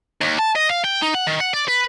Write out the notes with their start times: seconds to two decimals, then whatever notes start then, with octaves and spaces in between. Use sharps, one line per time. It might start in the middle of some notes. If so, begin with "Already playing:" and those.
0.21 D#2
0.39 A5
0.55 D#5
0.69 F5
0.84 G5
1.02 D#4
1.14 F#5
1.27 D#3
1.40 F#5
1.54 D5
1.68 B4